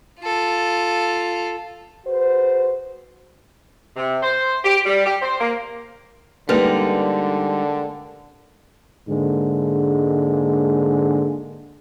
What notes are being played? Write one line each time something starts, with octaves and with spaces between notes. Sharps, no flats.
F4 A4
F#4 G#4 B4 C5
C3
C5
G4
G3
G4
C5
A#3
D3 G3 G#3 A#3 C#4 D#4 G4 B4
G#2 D3 G#3 A#3